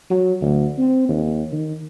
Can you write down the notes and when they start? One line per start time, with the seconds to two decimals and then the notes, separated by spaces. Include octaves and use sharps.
0.10 F#3
0.41 D2
0.78 C4
1.09 D#2
1.52 D#3